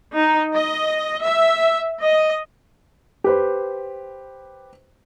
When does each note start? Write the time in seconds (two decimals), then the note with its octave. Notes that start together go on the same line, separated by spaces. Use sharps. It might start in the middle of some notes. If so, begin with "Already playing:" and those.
0.13 D#4
0.55 D#5
1.25 E5
2.01 D#5
3.24 G4 B4 C5